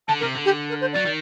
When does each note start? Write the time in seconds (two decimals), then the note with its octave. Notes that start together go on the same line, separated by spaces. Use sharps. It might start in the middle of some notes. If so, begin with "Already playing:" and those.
0.08 D3 A5
0.20 C3 A#4
0.35 D3
0.45 G4
0.70 A#4
0.81 C5
0.93 F#3 D5
1.06 D#3